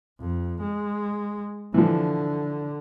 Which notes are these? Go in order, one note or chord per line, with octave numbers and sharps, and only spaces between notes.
F2
G#3
D3 E3 F3